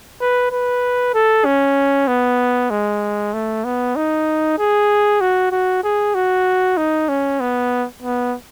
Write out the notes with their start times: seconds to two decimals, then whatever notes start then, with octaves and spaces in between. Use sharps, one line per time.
0.21 B4
0.51 B4
1.14 A4
1.45 C#4
2.08 B3
2.70 G#3
3.33 A3
3.64 B3
3.96 D#4
4.58 G#4
5.21 F#4
5.52 F#4
5.84 G#4
6.15 F#4
6.77 D#4
7.09 C#4
7.40 B3
8.02 B3